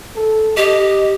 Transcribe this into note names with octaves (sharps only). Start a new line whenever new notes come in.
A4
G4 D#5